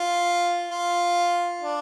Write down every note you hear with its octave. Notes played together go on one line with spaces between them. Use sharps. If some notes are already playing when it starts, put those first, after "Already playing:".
Already playing: F4
F4
D4